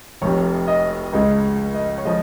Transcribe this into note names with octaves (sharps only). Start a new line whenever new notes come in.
F1 F2 C3 C#5
D#5
C#2 C#3 G#3 D#5
D#5
C#5
F3 G#3 D#5